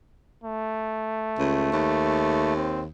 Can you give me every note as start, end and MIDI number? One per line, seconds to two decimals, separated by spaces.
0.44 2.53 57
1.39 1.69 37
1.72 2.88 39
2.57 2.81 60